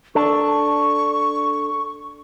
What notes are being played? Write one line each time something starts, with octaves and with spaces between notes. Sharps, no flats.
D4 A4 C#6